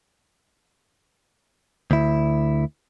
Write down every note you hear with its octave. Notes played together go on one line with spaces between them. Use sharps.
D2 E4